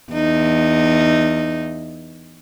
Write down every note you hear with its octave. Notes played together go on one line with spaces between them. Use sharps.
E2 D#4